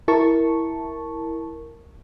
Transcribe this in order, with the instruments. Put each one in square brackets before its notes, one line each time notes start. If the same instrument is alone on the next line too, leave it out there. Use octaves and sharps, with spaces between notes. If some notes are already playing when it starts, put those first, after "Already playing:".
[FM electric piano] E4 A#4 A5 C#6